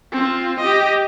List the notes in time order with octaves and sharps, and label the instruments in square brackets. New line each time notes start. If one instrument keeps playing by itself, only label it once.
[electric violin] C4 F4
G4 D#5